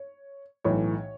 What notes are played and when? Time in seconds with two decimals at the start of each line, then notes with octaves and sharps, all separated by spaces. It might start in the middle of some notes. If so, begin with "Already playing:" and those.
Already playing: C#5
0.64 B1 A2 E3 C#5